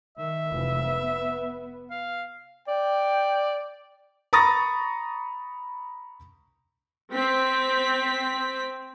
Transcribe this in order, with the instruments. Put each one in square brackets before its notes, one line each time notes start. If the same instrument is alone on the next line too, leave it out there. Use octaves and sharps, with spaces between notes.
[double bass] D#3 [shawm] E5
[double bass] F1 E3
B3
[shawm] F5
[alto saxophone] D5 [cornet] G5
[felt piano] A#5 B5 C#6 D#6 A6 A#6
[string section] C4 B6